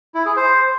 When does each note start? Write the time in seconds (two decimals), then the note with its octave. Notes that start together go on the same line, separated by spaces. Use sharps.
0.15 E4
0.26 G#4
0.37 C5